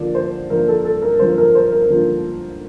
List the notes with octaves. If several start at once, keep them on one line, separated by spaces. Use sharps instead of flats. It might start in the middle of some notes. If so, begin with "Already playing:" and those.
Already playing: D3 F3 A#3 F4 D5
C5
D3 F3 A#3 F4 A#4
A4
A4
A#4
D3 F3 A#3 F4 C5
A#4
C5
A#4
D3 F3 A#3 F4